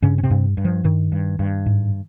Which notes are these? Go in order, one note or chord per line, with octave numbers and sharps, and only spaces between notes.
G2 C#3 C#4
C#4
C3 C4
G2
G2
F3
G2 D#3
G2
G2
G#2